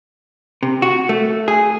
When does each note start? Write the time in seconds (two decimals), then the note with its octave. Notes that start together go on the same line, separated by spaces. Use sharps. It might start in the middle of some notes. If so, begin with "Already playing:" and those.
0.63 C3
0.82 F#4
1.09 A3
1.48 G#4